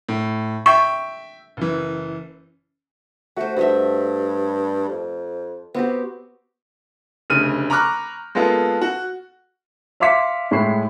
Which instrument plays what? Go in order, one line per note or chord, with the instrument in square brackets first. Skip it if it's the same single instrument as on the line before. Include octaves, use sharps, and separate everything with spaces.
[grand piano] A2
[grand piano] E5 G5 [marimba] C#6
[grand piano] F#1 E3
[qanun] A3 C5 [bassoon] F#4
[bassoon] G2 [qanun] F#4 D#5 E5
[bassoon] F2
[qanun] B3 F#4 G4 [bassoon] C4
[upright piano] F1 D2 C#3 F6 D#7
A#5 B5 C#6 D6 F6 F#6
G#3 A#3 B3 F4 A4
F#4
E5 F5 C6 D6 B6 C#7
A2 G#3 B5 C#6 C7